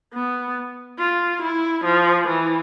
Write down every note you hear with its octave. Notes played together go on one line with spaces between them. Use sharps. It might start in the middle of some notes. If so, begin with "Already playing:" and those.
B3
F4
E4
F3
E3